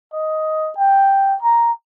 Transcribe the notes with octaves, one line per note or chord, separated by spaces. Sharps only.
D#5
G5
A#5